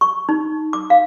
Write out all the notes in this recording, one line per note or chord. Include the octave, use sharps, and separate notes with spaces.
C#6
D#4
D6
F5